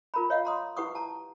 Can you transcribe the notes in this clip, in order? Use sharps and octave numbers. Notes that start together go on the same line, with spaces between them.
F4 A#4 A#5 B5
C#5 D#5 F5 F#5
A#5 C6 D#6
E4 G4 B4 F#5 C#6 D#6
A5 A#5